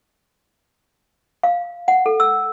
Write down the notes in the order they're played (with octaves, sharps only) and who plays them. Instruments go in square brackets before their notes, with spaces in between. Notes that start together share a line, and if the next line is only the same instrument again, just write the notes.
[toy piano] F5
F#5
A4
E6